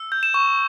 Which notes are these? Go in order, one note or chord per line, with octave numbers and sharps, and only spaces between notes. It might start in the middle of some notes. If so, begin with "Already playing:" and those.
Already playing: E6
G6
E7
C#6